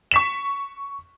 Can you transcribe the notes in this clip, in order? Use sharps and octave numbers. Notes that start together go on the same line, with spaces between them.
C#6 B6 E7